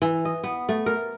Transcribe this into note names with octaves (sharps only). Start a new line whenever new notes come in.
E3
D#5
B3
A3
A#4